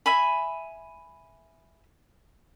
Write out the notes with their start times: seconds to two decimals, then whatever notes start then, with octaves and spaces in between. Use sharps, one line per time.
0.06 E5 G#5 B5